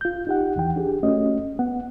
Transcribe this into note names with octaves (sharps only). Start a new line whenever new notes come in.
F4 G6
D#4 G4 F#5
E2 E3 G5
D4 G4 G#4
A3 C#4 F#4 D#5
B3 F#5